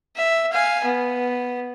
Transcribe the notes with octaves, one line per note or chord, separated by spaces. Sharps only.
E5
F5 G#5
B3